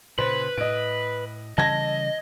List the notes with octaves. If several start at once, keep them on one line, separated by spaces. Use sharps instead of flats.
A#2 C#3 B4 C5
A2 D#5 D7
C#3 E3 G3 D#5 A5 G#6 A#6